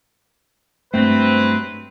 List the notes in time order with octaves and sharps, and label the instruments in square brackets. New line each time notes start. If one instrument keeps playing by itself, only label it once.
[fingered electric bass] G2 A3 [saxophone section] F#3 B3 C4 [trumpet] B4